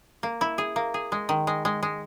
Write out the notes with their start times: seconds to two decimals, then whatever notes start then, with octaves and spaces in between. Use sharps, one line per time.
0.23 A#3
0.41 E4
0.58 G#4
0.76 A#3
0.94 G#4
1.12 G#3
1.29 D#3
1.47 G#3
1.65 G#3
1.83 G#3